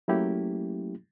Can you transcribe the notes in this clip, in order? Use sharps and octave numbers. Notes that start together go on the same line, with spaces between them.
F#3 A3 A#3 C#4 E4 G4